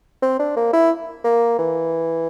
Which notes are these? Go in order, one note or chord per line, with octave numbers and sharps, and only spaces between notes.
C4
D4
A#3
E4
A#3
E3